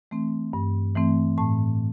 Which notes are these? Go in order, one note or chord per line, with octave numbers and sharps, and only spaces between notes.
E3 A3 C4
G2
E3 A3 C4
A2 A5